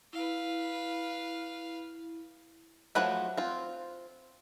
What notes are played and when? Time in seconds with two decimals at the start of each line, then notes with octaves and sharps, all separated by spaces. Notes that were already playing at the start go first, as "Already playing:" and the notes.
0.13 E4 B4 F5
2.95 F3 F#3 A3 G4 B4 F#5
3.37 C4 F4